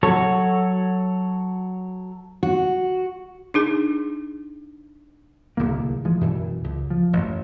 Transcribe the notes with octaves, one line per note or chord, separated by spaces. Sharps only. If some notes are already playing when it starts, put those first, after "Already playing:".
F#3 F#4 A4 C#5
F#4
D4 D#4 G#4
D1 C2 D#3 A#3
E3 F3 G#3
F#2 B2 E3
C#2
F3
A1 F#2